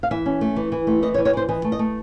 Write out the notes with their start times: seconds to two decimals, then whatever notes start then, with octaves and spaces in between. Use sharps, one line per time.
0.03 F5
0.11 E3 E5
0.26 C#4
0.41 A3
0.56 E3
0.72 E3
0.87 A3
1.02 E3 D#5
1.14 C#5
1.18 E3
1.25 C#5
1.33 E3 C5
1.49 E3 D#5
1.64 A3
1.72 D#5
1.79 A3